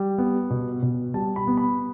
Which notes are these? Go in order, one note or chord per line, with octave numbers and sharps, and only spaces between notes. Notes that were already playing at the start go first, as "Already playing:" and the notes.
Already playing: G3
B3
B2
B2
G3 A5
B5
B3
B5